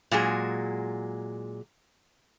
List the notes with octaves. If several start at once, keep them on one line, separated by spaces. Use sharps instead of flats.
A#2 F#3 G#3 G#4